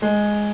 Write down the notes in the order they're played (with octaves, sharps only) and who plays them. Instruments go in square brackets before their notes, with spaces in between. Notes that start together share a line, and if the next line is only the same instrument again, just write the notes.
[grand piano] G#3